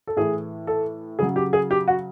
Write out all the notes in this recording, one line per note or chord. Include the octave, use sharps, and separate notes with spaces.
A4
A2 E3 G#4
A4
C#3 F#3 G#4
G4
G#4
G4
F#4